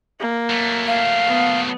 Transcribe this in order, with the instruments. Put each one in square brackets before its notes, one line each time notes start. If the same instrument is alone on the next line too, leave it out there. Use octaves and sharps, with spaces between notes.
[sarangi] A#3
[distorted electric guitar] F#3 A3
[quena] F5
[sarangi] B3